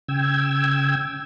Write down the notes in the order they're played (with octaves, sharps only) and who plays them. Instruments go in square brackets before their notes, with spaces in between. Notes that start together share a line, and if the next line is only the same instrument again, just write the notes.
[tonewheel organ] C#3 G5 E6 G#6